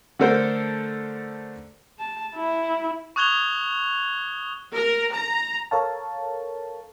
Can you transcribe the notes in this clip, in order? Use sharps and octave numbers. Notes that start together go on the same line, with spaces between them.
D3 A3 A4 A#4 C5
A5
E4
C#6 D#6 F#6 G#6 F7 G7
A#4
A#5
A4 A#4 C#5 F5 A5